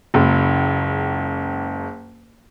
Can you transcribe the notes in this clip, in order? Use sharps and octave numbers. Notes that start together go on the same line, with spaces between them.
F#1 C#2